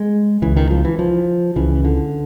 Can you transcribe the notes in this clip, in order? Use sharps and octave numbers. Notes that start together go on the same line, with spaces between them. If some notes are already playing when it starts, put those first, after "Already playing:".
Already playing: G#3
C#2 C#3 E3
D#3
F3
E3
F3
C#2 C#3 E3
D3